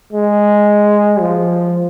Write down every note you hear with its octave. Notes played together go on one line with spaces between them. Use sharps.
G#3
F3